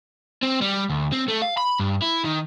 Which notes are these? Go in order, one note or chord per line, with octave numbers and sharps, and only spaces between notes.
C4
G3
D2
C4
A3
F5
B5
G2
E4
D#3